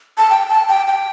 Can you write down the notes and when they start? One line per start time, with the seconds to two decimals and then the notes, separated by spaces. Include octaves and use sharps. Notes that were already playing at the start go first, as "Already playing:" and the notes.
0.18 A5
0.30 G5
0.49 A5
0.69 G5
0.87 G5